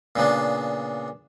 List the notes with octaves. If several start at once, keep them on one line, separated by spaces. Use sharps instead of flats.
A#2 C#3 B3 D4